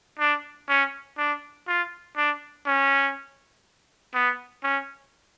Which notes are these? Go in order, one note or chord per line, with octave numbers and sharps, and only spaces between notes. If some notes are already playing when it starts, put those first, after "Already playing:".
D4
C#4
D4
F4
D4
C#4
B3
C#4